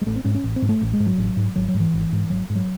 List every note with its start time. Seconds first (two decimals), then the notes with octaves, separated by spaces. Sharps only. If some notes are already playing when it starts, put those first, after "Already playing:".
0.02 G#3
0.06 A1 A3
0.16 C4
0.25 G#2 C#4
0.35 C#4
0.44 A1
0.56 C4
0.62 G#2
0.69 A3
0.81 A1
0.93 G#3
1.00 G#2
1.06 F#3
1.18 A1
1.37 G#2
1.56 G#1 F#3
1.68 F#3
1.74 G#2
1.80 E3
1.94 G#1
2.12 G#2
2.30 G#1 F#3
2.50 G#2
2.55 F#3